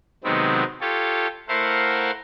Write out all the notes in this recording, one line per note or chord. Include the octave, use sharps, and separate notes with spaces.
C3 D#3 F#3 G#3 B3 C4
F4 G4 A4 C#5
A3 E4 A#4 C5 F5 F#5